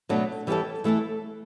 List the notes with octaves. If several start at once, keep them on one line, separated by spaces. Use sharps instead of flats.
B2 F#3 A3 D4
E3 G3 C#4 E4 A4
E3 A3 E4 A4